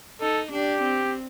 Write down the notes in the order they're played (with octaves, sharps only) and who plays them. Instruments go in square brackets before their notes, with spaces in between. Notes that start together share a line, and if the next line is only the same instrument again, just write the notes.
[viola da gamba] D#4 [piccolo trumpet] A4
[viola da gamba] D4 [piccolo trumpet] G4
[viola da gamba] C4